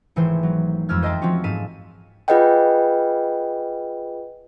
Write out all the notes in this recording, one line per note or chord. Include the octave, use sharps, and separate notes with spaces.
G#1 E3 A3 C5
F#3
F2 F3 G#3 E6 F6 G#6
C5 D#5 E5 G5 A5 C6
F3 C4 C#4 F4 F#4
G#2 A4 F5 B6 D#7 E7
F4 G#4 B4 D#5 F#5 G5